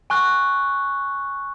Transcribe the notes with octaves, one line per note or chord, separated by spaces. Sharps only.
G#5 C#6 F#6